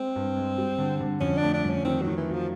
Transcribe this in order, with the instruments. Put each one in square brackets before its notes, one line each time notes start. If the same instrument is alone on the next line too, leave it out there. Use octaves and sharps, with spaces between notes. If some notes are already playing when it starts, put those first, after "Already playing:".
Already playing: [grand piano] G#3 [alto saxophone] C4
[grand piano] G2
G#3
G3
D3
D3
[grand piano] F2 [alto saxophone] C#4
[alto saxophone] D4
[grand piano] A3
[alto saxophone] D4
[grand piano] F2
[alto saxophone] C#4
[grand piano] D#3 [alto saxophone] C4
[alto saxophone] F#3
[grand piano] D#3
[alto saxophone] E3
[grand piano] F#3
[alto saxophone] F3